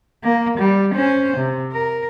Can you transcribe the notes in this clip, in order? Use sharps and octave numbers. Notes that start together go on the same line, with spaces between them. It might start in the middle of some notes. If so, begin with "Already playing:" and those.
A#3
G3
C#4 C5
C3
A#4